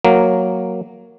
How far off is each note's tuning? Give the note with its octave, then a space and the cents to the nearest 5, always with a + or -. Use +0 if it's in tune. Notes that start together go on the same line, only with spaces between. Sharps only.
F#3 +0 A#3 +0